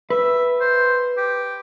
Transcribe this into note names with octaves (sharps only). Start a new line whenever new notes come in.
B4 E5
C5
G4